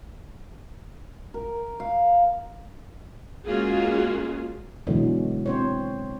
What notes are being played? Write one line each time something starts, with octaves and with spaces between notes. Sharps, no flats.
A#4
F5
G#3 A#3 C#4 F4 F#4 G#4
B2 D3 E3 F#3 G#3
C4 C5 C#5